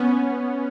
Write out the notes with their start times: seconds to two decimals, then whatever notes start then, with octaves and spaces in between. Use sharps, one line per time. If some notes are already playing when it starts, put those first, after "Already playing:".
Already playing: B3 C#4